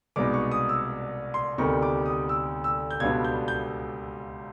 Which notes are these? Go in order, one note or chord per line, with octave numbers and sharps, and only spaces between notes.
C2 B2 G#3 B3 D#4 D6
C#6
D#6
E6
C6
D2 C3 D#3 G3 B3 C#6
D6
D#6
E6
E6
G6
C#2 B2 G3 B3 D4 G#6
G6
G6